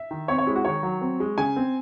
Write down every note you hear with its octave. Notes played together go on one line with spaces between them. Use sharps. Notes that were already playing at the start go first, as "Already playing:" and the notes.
Already playing: E5
D#3
C4 C#5
C#5
G#3 E4
F#4
D#3 C#5
F#3
C4
G#3
C#3 G#5
C4